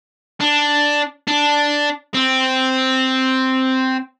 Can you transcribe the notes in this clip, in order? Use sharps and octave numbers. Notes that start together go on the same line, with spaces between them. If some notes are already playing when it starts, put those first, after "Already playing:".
D4
D4
C4